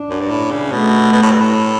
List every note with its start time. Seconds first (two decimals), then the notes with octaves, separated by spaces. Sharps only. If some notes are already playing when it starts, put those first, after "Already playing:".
Already playing: D4
0.10 F#2
0.21 G2
0.30 A2
0.51 C#3
0.71 B2 A3
1.13 B2
1.22 A2
1.31 G2
1.40 A2